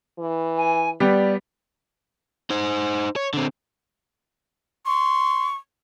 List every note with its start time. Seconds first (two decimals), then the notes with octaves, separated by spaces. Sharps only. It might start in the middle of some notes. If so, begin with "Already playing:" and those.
0.19 E3
0.57 G#5
1.00 G3 B3 G4 D5
2.50 D#4 C5
3.16 C#5
3.34 D3 C4
4.86 C6 C#6